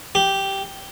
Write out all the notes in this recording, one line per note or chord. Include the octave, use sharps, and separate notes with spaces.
G4